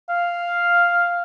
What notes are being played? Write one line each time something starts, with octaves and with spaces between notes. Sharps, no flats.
F5